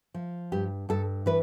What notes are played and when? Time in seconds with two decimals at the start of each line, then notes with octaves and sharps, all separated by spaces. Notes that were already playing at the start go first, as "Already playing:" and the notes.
0.14 F3
0.52 G2 G4
0.89 G2 A4
1.26 E3 B4